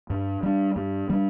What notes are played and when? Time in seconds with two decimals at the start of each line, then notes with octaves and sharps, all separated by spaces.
0.10 G2
0.43 G3 D4
0.76 G2
1.10 G3 D4